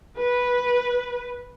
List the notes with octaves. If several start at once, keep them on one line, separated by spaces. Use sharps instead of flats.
B4